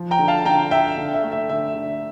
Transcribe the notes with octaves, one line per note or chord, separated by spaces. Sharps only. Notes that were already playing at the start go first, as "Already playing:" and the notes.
Already playing: F3
G5 A#5
D3
F5 A5
D3 G5 A#5
D3 E5 G5
D3
E5
A3
E5
D3 E5
D3